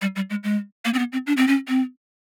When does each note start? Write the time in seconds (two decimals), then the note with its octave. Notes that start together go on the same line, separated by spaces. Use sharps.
0.02 G3
0.16 G3
0.30 G#3
0.44 G#3
0.85 A#3
0.94 C4
0.99 B3
1.12 C4
1.27 D4
1.37 C4
1.47 C#4
1.68 C4